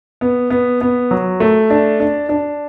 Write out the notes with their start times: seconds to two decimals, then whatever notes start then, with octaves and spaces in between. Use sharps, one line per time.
0.21 B3
0.50 B3
0.81 B3
1.11 F#3
1.40 A3
1.70 D4
2.00 D4
2.29 D4